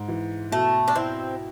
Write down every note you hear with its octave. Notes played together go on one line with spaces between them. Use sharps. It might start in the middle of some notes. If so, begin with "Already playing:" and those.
Already playing: G#2
E3
B2 A3
D4
C4 E4